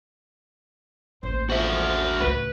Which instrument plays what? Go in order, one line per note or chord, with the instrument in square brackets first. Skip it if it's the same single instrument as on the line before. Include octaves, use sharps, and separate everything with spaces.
[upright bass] A1 D#2 [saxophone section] C5
[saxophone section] G#2 D3 F3 [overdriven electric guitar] F#4 E5
[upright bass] C#2 A2 [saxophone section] B4